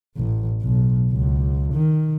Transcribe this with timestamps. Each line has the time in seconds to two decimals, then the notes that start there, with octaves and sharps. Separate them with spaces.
0.17 A1
0.63 B1
1.12 C#2
1.74 D#3